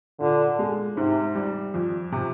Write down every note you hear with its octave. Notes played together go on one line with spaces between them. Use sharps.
A#2 D3
G#3
G#2 C3
G3
F2
C3